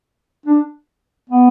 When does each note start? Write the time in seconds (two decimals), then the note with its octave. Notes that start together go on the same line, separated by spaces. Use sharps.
0.46 D4
1.29 B3